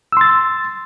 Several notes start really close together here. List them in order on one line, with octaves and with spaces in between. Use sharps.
E6 C6 A6